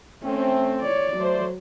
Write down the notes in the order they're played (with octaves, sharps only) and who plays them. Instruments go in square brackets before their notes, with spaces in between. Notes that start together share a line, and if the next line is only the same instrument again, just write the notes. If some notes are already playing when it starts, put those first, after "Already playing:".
[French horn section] A3 C4 [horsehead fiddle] C#4
[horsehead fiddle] C#5 D5
[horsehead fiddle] F#3 [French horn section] A3 C5 D5